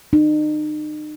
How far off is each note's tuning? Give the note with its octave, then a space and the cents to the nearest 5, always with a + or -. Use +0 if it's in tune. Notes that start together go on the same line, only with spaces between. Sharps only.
D#4 -40